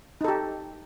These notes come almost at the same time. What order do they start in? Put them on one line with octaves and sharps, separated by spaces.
D#4 A4 G4